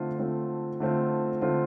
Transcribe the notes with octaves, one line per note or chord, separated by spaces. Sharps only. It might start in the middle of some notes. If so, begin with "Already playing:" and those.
Already playing: D3 A3 C4 F4
D3 A3 C4 F4
D3 A3 C4 F4
D3 A3 C4 F4